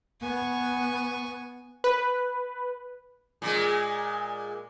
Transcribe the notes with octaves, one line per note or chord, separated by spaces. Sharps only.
B3 G#5 C#6
B4
A#2 G#3